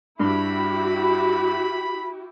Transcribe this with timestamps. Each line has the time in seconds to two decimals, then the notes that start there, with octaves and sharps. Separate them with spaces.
0.19 G2 E4 F#4 G4 B5